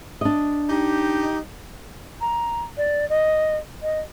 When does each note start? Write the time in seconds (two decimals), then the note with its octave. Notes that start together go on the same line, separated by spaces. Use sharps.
0.21 D4 D#5
0.69 D#4 G4
2.21 A#5
2.77 D5
3.09 D#5
3.82 D#5